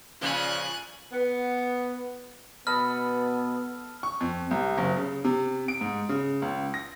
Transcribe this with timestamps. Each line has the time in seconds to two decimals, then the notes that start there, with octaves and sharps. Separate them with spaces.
0.21 A#2 C#3 F3 G#5 F#6
1.13 B3
2.67 B2 B3 A4 D#5 B5 F6
4.03 C#6
4.21 F2
4.51 C2
4.78 F#1
4.96 C#3
5.24 C3
5.68 D7
5.81 G#2
6.09 C#3
6.42 C#2
6.74 A#6